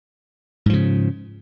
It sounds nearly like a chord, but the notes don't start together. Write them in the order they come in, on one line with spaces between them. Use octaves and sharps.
G#2 F3 C#3